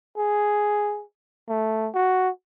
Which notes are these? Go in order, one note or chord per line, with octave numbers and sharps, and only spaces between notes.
G#4
A3
F#4